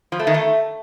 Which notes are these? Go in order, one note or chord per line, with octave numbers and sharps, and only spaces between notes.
F3
A3
D#3
A3